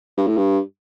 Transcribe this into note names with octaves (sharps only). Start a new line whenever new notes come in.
G2
A2
G2